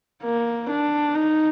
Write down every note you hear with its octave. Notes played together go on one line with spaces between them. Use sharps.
A#3
D4
D#4